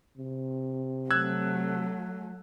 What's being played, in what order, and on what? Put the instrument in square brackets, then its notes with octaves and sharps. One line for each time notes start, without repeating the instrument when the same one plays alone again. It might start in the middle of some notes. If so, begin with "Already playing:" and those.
[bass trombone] C3
[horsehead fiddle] F#3 A3 [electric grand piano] E6 F#6 G#6